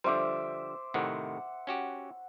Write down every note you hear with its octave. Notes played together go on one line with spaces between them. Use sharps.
D3 F3 G3 C5 E5 D6
A2 C3 D#3 F#5
C#4 F#4 G4